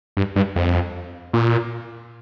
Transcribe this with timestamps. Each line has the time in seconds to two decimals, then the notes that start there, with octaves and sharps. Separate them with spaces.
0.17 G2
0.36 G2
0.56 F2
1.33 A#2